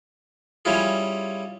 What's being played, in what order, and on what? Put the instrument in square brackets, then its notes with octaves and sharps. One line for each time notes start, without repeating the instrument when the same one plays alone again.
[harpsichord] G3 C#4 E4 F4 G#4